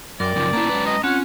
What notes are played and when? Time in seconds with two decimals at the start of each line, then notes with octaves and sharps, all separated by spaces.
0.20 F#2 A#4 D5 G5 D6
0.36 F#2 C#3 F3
0.53 A#3 B3 C#4 E4 A5 A#5
0.70 F#3 G#3 B4
0.86 D#5
1.04 C4 C#4 F4 F#5